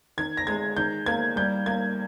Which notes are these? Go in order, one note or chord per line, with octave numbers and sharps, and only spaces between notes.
D#3 G#6
A#6
G#3 G#6
D#3 G6
A#3 G#6
G3 G6
A#3 G#6